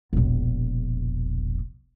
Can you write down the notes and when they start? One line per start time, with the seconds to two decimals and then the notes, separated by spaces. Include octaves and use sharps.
0.13 E1 A#1